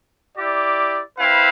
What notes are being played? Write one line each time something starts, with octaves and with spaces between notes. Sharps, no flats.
E4 G4 D5
C4 E4 B4 F5